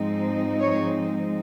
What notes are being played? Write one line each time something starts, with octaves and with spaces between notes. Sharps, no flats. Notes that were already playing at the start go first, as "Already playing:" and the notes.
Already playing: G#2 F3 G#3 C4 D#4
C#5